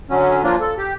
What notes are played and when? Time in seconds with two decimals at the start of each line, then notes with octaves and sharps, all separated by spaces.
0.10 D3 F#3 C#4
0.43 F3 A#3 D4 F4
0.60 A4
0.77 G4